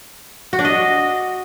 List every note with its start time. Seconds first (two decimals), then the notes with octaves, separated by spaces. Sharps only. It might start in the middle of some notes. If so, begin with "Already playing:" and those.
0.53 F#4
0.59 D4
0.65 D#5